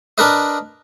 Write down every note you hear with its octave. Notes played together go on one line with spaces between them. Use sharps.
D4 A#4 B4 D#5